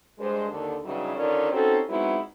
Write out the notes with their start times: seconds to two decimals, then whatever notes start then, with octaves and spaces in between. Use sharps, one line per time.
0.19 G2 G#3 C5
0.49 D#2 D3 A4
0.84 G2 C#3 E3 F#3 G3 D#4
1.15 D3 D#3 C#4 F4 D5
1.52 C4 C#4 D#4 F#4 G4 A4
1.89 F#3 G#3 B3 C4 D#4 E4